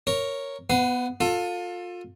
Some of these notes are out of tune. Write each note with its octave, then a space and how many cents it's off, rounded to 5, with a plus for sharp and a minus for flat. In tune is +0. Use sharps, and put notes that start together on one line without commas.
A#4 +0 C#5 +0
B3 +0 B4 +30 F5 -15
F4 +25 A4 +20